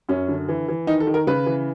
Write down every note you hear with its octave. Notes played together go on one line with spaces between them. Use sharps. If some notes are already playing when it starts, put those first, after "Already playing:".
F#2 C#4
D3
E3
E3
D#3 D#4
A4
D#3
A#4
C#3 B4
E3